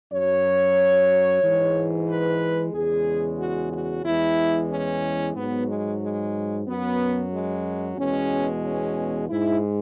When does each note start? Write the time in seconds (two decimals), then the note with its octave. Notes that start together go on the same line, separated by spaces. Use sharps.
0.12 F#2 F#3 C#5
1.42 G#2 E3 G#3
2.08 B4
2.73 E2 C#3 G#3 G#4
3.39 F#4
3.72 F#4
4.05 E2 E3 G#3 E4
4.70 C#4
5.35 G#2 F#3 B3
5.68 G#3
6.01 G#3
6.67 F#2 F#3 B3
7.32 G#3
7.97 E2 B2 G#3 C#4
8.64 C#4
9.28 G#2 G#3 E4